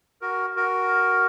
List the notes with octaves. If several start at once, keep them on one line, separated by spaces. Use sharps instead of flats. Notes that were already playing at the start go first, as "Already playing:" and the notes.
F#4 A#4
F#4 A#4